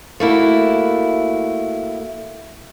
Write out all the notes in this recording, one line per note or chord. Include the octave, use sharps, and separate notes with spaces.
A3 A#3 E4 F#4